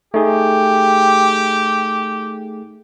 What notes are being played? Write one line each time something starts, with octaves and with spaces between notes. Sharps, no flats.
A3 D#4 G4 G#4